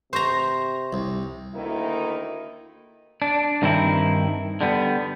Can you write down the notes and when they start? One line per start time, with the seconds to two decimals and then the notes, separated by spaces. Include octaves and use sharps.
0.13 C3 C5 A#5 C6 C#6 A#6
0.93 C2
1.55 D2 D#3 A#3 D#4 E4
3.22 D4
3.62 G2 D#3 C4 D#4 E4
4.61 D3 G3 B3